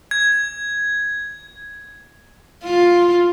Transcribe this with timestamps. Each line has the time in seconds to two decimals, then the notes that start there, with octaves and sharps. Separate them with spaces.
0.11 G#6
2.64 F4